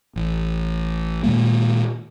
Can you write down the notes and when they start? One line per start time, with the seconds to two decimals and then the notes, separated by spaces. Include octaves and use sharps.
0.16 A1
1.24 A#2 D#3 G#3 A#3